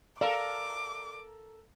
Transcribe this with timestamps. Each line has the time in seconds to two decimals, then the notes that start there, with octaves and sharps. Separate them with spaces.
0.21 A4 A#4 D5 F5 A5 A#5 D6